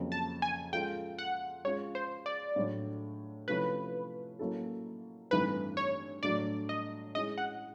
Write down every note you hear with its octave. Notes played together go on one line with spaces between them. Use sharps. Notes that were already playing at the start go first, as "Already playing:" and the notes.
Already playing: F2 C#3 F#3 A#3 C#4
A5
G#5
G#3 C#4 F4 A4 G5
F#5
G#3 C#4 F4 C#5
C5
D5
A2 F#3 A3 D4
C3 F3 A3 C#4 E4 B4
F#3 A#3 C#4 E4 A4
G2 E3 A3 C4 D#4 B4
C#5
A2 F#3 A3 D4 D5
D#5
G#3 C#4 E4 G#4 D#5
F#5